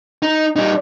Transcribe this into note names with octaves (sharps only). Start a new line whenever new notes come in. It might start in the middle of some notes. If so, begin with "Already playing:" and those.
D#4
G3 D#4